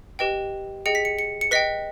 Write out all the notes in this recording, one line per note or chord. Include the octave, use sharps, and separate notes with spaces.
G4 B4 D#5 G5
G#4 D#5 G5 C#7
B6
C#7
C#7
C#7
B4 D#5 G5 B6